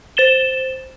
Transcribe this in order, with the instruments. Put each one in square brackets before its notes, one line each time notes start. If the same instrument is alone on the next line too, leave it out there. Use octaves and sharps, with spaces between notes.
[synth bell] C5 A6 E7 G7